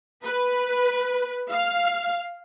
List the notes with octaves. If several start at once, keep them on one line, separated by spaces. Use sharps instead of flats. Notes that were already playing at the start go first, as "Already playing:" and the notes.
B4
F5